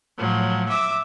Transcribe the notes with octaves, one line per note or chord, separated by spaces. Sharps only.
A2 F3 F#3
E5 D6 E6